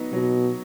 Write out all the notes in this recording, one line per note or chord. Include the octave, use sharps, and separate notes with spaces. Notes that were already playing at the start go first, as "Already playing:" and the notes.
Already playing: F#3 B3 D#4
B2 F#3